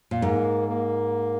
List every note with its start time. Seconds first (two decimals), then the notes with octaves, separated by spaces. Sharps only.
0.11 A#2
0.22 G#2 A#3
0.68 A#3